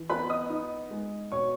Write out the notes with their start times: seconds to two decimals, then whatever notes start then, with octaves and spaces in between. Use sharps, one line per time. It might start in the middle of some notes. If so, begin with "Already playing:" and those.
Already playing: E3
0.10 B3 B4 B5
0.30 D#5 D#6
0.50 D#4
0.91 G#3
1.32 B2 C#5 C#6